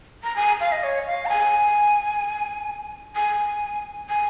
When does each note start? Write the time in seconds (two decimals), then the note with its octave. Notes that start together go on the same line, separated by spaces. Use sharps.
0.24 A#5
0.36 G#5
0.60 F5
0.72 D#5
0.83 C#5
1.07 F5
1.26 A#5
1.30 G#5
3.16 G#5
4.09 G#5